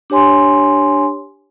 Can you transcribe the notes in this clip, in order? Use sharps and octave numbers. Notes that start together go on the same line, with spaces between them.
D4 G4 C#5 G#5 C6